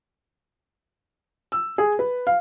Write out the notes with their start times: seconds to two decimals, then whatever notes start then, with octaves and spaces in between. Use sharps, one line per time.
1.52 E6
1.78 G#4
1.99 B4
2.27 F5